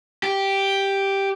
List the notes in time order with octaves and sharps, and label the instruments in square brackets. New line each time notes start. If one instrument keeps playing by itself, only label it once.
[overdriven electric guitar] G4